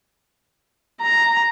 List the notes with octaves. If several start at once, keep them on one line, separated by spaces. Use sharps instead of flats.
A#5